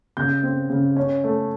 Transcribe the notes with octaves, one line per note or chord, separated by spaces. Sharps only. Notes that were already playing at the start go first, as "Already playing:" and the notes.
C#3 G6
C4
C#3
C#4
A3